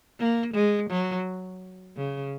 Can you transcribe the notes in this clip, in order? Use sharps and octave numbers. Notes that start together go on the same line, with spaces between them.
A#3
G#3
F#3
C#3